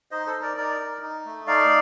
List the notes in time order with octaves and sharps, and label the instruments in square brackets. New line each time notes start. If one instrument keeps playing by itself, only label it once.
[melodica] D#4 C5 D#5
A4 C5
D#4
A#4 D5
D#4 A#4 D5
D#4
D#4
A3
D#4 D5 F5